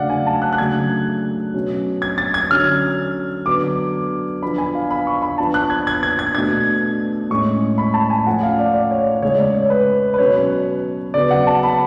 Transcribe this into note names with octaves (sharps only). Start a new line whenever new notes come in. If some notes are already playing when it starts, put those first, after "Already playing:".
Already playing: C#3 F#3 A3 D4 D5 F5 F#5
G#5
A5
F#6
F#6
C#3 F#3 A3 D4 G#6
B2 F#3 C#4
G#6
A6
G#6
D3 F#3 C#4 F6
D3 F#3 B3 D4 D6
F3 B3 D4 B5
G#5
F5
B5
C#6
B5
F3 B3 D4 A5
F#6
G#6
G#6
G#6
G#6
B2 A3 D4 G#6
A2 G#3 C#4 C#6
B5
A5
G#5
F3 A3 C#4 F#5
F5
D5
D5
C#5
C#3 G#3 C#4 C#5
D5
C#5
B4
B4
B2 F#3 C#4 C#5
C#3 F#3 B3 D5
F#5
A5
B5